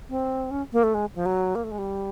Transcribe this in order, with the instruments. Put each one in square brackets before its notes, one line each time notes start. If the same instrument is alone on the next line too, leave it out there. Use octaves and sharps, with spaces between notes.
[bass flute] C4
C#4
A#3
A3
G#3
F3
F#3
A#3
A3
G#3
G3